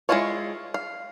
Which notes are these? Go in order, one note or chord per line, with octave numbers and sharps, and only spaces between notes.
G#3 A3 E4 F4 C#5
F5